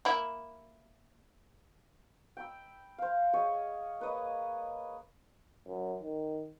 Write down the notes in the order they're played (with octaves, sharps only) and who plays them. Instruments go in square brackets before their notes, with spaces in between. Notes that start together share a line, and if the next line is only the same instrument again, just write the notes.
[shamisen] A#3 E4
[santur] G5 B5 E6
C5 F5
G#4 C#5 D#5
A#3 B4 C#5 D#5
[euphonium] F#2
D#3